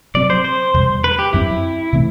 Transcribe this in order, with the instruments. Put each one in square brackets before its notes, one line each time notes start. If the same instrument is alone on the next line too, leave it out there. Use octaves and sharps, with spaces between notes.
[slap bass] C3 F#3 C4 [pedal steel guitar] D5
[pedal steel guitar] C5
C5
[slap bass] E2 C3 G3
[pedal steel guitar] B4
G4
[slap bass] F#2 F#3 C4 [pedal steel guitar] E4
[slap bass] C3 E3 A3 C4